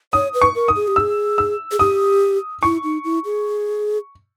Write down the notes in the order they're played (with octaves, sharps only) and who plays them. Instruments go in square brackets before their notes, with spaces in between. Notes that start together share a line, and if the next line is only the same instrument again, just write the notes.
[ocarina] C#5 [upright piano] D#6
[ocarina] B4
[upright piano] C#6
[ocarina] A#4
[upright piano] D#6
[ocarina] G#4
G4
[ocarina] G#4 [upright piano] E6
[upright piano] E6
[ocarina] G#4
[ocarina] G4 [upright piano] D#6
[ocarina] E4 [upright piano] C#6
[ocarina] D#4
E4
G#4